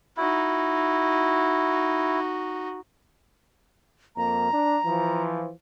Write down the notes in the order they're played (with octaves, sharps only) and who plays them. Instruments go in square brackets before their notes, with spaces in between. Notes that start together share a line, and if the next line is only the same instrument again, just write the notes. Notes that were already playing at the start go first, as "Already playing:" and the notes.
[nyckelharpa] D#4 F#4 [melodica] E4
[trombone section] F2 A#3 [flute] A#5
[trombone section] D4
E3 F3